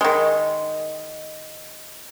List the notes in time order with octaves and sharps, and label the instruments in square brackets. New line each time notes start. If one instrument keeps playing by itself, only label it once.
[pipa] D#3 G#3